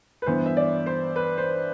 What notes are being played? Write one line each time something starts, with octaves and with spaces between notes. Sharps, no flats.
B4
G2 E3 B3 C5
E5
D5
C5
B4
C5